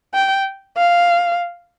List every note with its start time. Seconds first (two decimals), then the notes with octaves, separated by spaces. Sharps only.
0.14 G5
0.78 F5